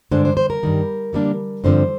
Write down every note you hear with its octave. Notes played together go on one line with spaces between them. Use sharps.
G2 D3 G#3 D4 C5
C5
C5
A#4
G2 D#3 G3
D3 G3 A#3 D4
G2 D3 F3 C4 C5